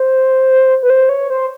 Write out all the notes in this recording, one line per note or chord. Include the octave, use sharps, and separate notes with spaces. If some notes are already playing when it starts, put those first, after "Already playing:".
Already playing: C5
B4
C5
C#5
C5